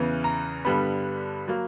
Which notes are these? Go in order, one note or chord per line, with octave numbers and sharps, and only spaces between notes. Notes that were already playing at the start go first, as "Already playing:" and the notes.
Already playing: E2 C#3 E3
A#5
G2 D3 G3 B3 B5
F#3 A#3